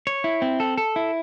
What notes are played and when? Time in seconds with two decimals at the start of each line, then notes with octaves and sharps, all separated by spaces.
0.07 C#5
0.24 E4
0.42 C4
0.60 A4
0.77 A4
0.96 E4